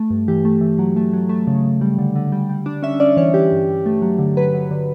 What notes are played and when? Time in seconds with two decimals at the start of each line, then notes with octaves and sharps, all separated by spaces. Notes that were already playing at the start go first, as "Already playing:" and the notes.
Already playing: A3
0.10 G2
0.28 E3 G4
0.45 A3
0.61 E3
0.79 F#3
0.96 A3
1.13 F#3
1.29 A3
1.47 C#3
1.64 C#3
1.81 G3
1.99 D3
2.16 D3
2.32 G3
2.49 G3
2.66 D4
2.83 C#4 E5
3.00 C#4 D5
3.17 E3 C#5
3.34 E3 G4
3.52 G2
3.69 G2
3.86 A3
4.02 F#3
4.19 D3
4.37 F#3 B4
4.54 F#3
4.71 D3